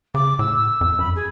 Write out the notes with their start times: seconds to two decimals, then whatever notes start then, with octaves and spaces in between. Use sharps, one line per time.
0.14 C#3 D6
0.39 A2 E6
0.81 F2
0.99 F#2 B5
1.15 G#4